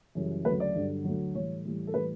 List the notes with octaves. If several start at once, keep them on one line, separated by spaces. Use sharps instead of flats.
F#2 C#3 E3 G3
D2 C#3 F#3 B4
D5
G2 D3 F#3
D2 D3 F#3
A2 E3 G3 C#5
A2 E3 G3
A4
A2 E3 G3 B4